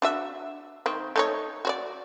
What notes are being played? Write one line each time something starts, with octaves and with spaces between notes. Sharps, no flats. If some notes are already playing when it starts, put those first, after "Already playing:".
D4 F#4 E5
D#3 C4
A3 D#4 C#5
F#4 C#5 D5